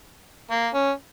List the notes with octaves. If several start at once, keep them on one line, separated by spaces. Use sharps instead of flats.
A#3
C#4